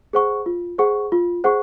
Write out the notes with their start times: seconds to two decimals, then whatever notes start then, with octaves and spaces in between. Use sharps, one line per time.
0.13 G#4 C5 F#5 C#6
0.46 F4
0.78 G#4 C5 F#5 C#6
1.12 F4
1.44 G#4 C5 F#5 C#6